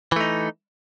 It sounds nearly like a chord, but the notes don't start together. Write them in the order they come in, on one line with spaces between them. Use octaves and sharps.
E3 A3 D#4